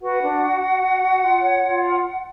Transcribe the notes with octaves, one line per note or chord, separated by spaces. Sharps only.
F#4 B4 F#5
D4
F#4
F#4
F#4
F#4
F4
C#5
F4